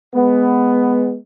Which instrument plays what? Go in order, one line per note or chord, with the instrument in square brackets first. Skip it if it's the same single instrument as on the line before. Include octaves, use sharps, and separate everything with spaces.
[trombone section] G#3 B3